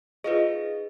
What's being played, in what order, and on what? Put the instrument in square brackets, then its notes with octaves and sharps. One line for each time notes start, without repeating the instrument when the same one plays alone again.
[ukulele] D#4 F4 D#5 [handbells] G#4 B4